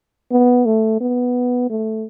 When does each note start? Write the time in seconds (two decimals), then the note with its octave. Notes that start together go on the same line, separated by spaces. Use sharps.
0.31 B3
0.66 A3
1.01 B3
1.70 A3